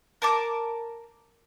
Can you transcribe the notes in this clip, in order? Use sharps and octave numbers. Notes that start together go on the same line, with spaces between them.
A#4 A5 D6